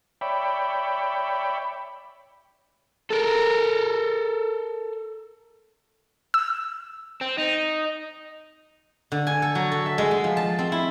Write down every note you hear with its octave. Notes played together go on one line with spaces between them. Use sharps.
C#5 D5 E5 G5 B5
A4 A#4
E6
C4
D#4
D3
G#5
A4
F#3
A4
E5
G#3
G#3
F3
A5
C4
E4